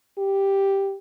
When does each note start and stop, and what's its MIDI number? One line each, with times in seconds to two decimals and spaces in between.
0.18 0.96 67